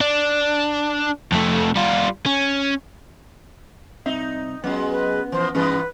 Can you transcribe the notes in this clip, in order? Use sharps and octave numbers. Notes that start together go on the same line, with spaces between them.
D4
F2 A3
G3 F4
C#4
C2 C4 D#4 E5
F#3 G#3 B3 C#4 F4
B4
E3 F3 C5
G2 E3 B3 C#4 G#4 B4